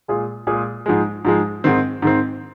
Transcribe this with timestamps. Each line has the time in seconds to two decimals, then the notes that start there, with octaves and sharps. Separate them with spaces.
0.08 A#2 G#3 F4 G#4
0.47 A#2 G#3 F4 G#4
0.86 G#2 F3 G#3
1.25 G#2 F3 G#3
1.64 G#2 D#3 C4
2.02 G#2 D#3 C4